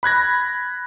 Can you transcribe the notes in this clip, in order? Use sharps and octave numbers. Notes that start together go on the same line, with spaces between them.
B5 F#6 G#6 A#6